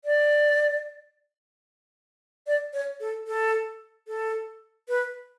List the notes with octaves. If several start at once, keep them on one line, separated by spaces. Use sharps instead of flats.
D5
D5
C#5
A4
A4
A4
B4